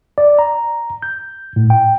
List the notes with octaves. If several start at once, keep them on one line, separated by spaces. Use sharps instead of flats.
D5
A#5
G6
A2
G5